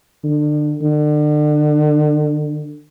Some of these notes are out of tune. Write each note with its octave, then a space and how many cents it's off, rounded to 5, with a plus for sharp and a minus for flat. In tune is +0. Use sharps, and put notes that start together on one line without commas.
D3 +30
D3 +35